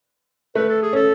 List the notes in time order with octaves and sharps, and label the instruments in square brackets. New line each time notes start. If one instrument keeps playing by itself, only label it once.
[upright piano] A3 [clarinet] B4
[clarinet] A4
G#4
[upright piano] C#4 [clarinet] A4